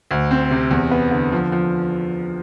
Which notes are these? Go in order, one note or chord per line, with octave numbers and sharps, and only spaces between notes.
D2
C4
C3
E2
B3
D3
F3
F3